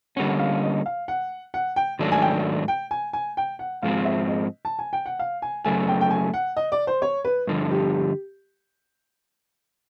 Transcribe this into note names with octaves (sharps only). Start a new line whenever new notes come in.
D3 G3 A#3 C#4 F#5
F5
D#5
F5
F#5
F#5
G5
G#2 D#3 F#3 A3 D4
G#5
G5
G5
G#5
G#5
G5
F#5
G#2 F3 G#3 C4 F5
E5
D#5
A5
G#5
G5
F#5
F5
G#5
F#2 C#3 F#3 A3 G#5
G5
G5
G#5
F#5
D#5
D5
C5
C#5
B4
G2 D3 F3
G4
G4